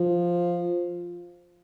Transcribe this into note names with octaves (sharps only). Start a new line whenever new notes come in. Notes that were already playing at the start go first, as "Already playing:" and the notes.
Already playing: F3